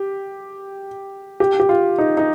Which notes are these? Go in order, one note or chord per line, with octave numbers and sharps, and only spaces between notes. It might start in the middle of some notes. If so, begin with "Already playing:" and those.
Already playing: G4
G4
G4
F4
D#4
D#4